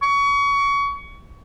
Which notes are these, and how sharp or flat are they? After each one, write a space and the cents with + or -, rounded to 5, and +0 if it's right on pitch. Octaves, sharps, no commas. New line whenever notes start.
C#6 +25